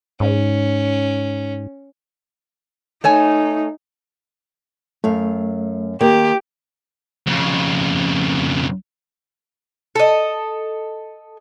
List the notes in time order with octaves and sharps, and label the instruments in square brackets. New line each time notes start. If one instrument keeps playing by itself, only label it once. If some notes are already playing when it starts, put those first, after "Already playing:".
[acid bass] G#2 [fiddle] C#4
[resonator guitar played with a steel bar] A3 C#5 G#5 [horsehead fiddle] D#4
[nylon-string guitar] F#2 F5 [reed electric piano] A3
[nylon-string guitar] D#3 A#3 [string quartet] G4
[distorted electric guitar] F2 C#3
[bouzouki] A4 D#5